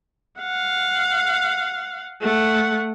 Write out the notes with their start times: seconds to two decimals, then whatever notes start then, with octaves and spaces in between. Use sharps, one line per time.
0.39 F5 F#5
2.21 A3 F#5